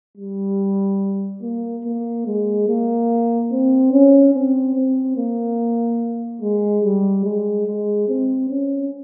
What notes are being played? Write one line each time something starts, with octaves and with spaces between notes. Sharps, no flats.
G3
A#3
A#3
G#3
A#3
C4
C#4
C4
C4
A#3
G#3
G3
G#3
G#3
C4
C#4